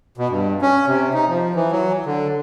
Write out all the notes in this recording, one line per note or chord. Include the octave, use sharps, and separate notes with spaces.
B2
G2
C#4
C3
D#4
F3
E3
F#3
D3